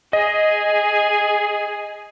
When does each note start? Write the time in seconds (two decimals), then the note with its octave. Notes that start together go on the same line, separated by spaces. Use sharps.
0.13 G#4 D#5